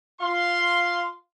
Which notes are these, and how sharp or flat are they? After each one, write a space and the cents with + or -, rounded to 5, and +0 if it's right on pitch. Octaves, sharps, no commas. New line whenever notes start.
F4 +0 F5 +0 C6 +0